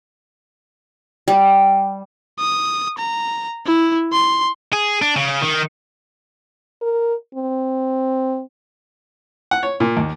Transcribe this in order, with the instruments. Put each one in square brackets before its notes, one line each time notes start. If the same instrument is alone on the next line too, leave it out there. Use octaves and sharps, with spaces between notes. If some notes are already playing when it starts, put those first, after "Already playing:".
[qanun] G3
[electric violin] D#6
A#5
E4
C6
[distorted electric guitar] G#4
D4
C#3
D#3
[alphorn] A#4
C4
[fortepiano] F#5
C#5
A#2
D#2